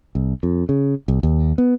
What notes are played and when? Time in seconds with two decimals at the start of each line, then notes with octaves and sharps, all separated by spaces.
0.15 C2
0.43 F2
0.69 C#3
1.08 C2
1.23 D#2
1.58 B3